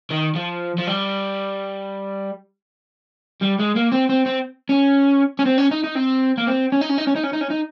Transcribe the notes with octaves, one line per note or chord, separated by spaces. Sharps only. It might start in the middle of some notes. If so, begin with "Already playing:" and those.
D#3
F3
F3
G3
G3
G#3
A#3
C4
C4
C4
C#4
C#4
C4
C#4
D#4
D#4
C4
A#3
C4
C#4
D#4
C#4
D#4
C#4
D#4
C#4
D#4
C#4
D#4